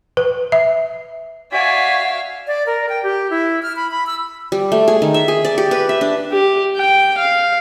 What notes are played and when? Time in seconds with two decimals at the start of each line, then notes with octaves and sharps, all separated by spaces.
0.17 B4
0.52 E5
1.52 F#4 D5 E5 F5 G#5 B6
2.47 D5
2.67 A#4
2.89 G5
3.03 G4
3.30 E4
3.63 F6
3.76 B5
3.91 B5
4.07 E6
4.52 G3
4.72 A3
4.88 G#4
5.02 D#3
5.14 E5
5.28 G#4
5.45 D5
5.58 G4
5.71 B4
5.89 E5
6.01 D4
6.31 G4
6.76 G5
7.17 F5